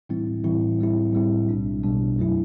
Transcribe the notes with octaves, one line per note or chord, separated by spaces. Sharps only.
A2 E3 G3 C4 E4
A2 E3 G3 C4 E4
A2 G3 C4 E4
A2 G3 C4 E4
B1 B2 G3 D4
B1 B2 G3 D4
F#2 F#3 A3 E4